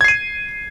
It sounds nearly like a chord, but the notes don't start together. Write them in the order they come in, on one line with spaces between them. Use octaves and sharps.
G#6 C7 D#7